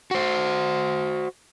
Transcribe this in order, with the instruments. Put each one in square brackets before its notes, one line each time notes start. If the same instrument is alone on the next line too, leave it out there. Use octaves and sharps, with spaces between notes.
[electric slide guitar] F#4 C5